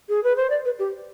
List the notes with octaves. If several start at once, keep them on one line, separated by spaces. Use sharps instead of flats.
G#4
B4
C5
D5
B4
G4